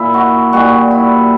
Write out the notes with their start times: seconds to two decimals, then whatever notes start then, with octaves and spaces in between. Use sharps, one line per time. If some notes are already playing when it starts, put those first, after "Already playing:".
Already playing: A#2 E4
0.14 F#4
0.53 A#2 G3 F#4
0.91 E4